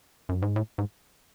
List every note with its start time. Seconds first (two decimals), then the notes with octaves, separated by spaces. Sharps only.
0.29 F#2
0.42 G#2
0.56 A2
0.78 G#2